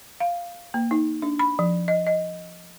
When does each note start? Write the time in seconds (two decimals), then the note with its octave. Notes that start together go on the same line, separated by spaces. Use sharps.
0.20 F5
0.74 A#3
0.91 D#4
1.22 D4
1.39 B5
1.59 F3
1.88 D#5
2.07 D#5